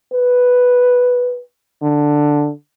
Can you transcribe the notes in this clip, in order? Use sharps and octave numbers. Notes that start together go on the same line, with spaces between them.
B4
D3